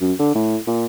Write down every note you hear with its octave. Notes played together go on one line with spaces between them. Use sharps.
F#2
D3
A2
A#2